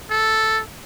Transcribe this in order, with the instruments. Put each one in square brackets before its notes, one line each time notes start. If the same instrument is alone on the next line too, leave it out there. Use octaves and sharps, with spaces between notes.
[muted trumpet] A4